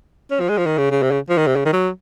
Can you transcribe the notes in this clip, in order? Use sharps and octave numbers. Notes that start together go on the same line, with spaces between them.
C#4
F3
G#3
F3
D#3
C#3
C#3
C3
C#3
F3
D#3
C3
C#3
D#3
F#3